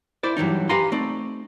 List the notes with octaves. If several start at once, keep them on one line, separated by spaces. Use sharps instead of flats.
E4 C5 D5
G2 E3 F#3 D#4
G4 B4 F5 G#5 A#5 C6
A3 C4 D#4 D5